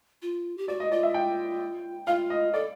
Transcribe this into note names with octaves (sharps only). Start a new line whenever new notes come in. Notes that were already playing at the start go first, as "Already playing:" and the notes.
F4
G4
F#4 D5
D#5
F4 D5
E5
G5
F4 F5
D#5
A4 D5